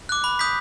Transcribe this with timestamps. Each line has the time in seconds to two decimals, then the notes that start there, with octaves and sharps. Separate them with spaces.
0.09 D6 F#6
0.24 B5
0.39 D#6 G6 B6